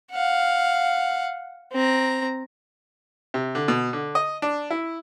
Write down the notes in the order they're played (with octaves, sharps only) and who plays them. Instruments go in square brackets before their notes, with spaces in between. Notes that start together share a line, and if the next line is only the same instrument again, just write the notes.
[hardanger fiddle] F5 F#5
C4 A#5
[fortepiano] C3
D3
B2
D3
D#5
D4
E4